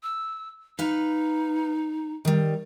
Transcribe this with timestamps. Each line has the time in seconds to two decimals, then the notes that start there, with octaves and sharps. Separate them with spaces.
0.03 E6
0.79 D#4 B4 F5
2.25 D#3 G3